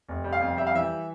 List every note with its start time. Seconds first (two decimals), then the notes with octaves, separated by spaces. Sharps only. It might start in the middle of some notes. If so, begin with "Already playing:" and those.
0.09 F1
0.24 G3
0.33 F5
0.41 F2
0.57 G3 E5
0.67 F5
0.75 E3 E5